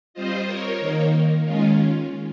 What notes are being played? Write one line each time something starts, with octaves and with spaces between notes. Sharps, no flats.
G3 C4 F4 C5 D#5
A#4 C#5
D#3 A#3 D#4
D#3 G#3 C#4 F4